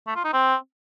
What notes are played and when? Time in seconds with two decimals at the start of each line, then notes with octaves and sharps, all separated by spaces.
0.07 A3
0.16 F4
0.24 D#4
0.33 C4